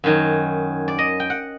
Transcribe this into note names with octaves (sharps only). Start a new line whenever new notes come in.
F#2 D#3 F#3
D5
D#5
G5
F#5